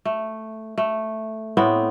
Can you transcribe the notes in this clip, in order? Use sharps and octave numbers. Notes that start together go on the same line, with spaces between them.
A3
A3
A2 B3 C4